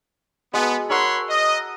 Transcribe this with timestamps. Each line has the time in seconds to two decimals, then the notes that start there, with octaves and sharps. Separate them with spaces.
0.54 G#3 B3 F#4 A4
0.90 A#4 C#5 E5 F#5 B5 C6
1.29 D#5